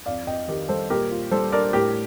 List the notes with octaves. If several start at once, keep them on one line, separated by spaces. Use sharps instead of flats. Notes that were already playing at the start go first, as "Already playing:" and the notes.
F2 D5 F5
F2 D#5 G5
D#3 G4 A#4
G3 A4 C5
A#2 G4 A#4
F4
G3 A4 C5
D4 A#4 D5
A2 G4 A#4